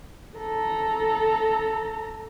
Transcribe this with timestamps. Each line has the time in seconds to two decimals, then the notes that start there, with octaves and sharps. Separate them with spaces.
0.38 A4 A#5